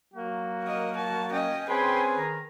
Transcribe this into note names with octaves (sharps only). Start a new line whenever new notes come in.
F#3 A#3 F#4
A#4 D#5
A5
C#4 D#5 G5
C4 C#4 G#4 B4 G5 G#5 B5 C6
D#3 A#5